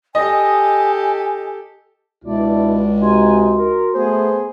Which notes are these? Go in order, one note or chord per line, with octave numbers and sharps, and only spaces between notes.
G4 A4 D#5 G#5
C#2 B2 D4 E4 D5
C3 D#4 F#4 G#5 C6
A#4
A3 B3 G#4 C5